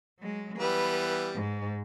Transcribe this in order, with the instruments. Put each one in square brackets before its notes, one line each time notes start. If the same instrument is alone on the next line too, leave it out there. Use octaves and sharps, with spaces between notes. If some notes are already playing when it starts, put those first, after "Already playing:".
[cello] F#3 G#3
[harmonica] E3 G3 B3 [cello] B4
[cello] G#2